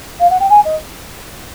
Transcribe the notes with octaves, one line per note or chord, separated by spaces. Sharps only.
F5
F#5
G5
G#5
D#5